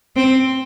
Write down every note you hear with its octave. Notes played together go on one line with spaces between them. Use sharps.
C4